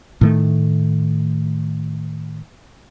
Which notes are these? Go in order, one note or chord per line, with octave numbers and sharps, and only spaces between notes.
A2 D#3 A3